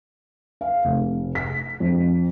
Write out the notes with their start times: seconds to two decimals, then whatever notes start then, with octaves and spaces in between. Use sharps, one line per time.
0.61 F5
0.85 F1
1.35 B6
1.80 F2